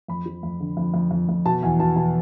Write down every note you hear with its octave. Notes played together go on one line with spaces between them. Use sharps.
F2 B5
F3
F2
D3
F2
F2
F2
F2
B2 A5
E2 G#5
B2 A5
B2 A5